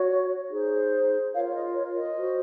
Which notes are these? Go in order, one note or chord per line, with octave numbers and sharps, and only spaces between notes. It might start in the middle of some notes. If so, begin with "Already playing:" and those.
Already playing: F#4 C#5
D#4 G#4 C5
F4 A#4 C#5 F5
C#5
D#5
C#5
D#5
F#4 C5